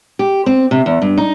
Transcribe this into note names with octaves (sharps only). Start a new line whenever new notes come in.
G4
C4
C3
E2
G2
D#4